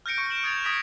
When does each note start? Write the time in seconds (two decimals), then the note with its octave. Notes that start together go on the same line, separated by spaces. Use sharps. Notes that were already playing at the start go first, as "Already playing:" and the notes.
0.06 F6 G6 A#6 C#7 D7
0.18 C#6 G6 C#7
0.30 E7 F#7
0.43 D#6 G#6 A6 C#7 F7
0.65 C#6 D#6 G#6 A#6 B6